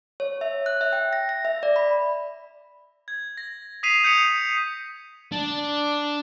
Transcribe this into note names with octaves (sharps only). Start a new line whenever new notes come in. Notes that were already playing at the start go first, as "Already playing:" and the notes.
C#5
E5
F#6
E5
G5
A#6
A#6
E5
D5
B5
G#6
A#6
D#6 B6 C7 D#7 F7
D#6 G6 B6 C#7 F7
D4